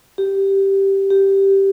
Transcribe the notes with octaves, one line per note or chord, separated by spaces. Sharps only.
G4
G4